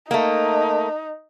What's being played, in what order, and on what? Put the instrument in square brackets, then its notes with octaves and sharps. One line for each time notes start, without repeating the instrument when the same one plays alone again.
[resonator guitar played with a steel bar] A3 A#3 [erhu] D#4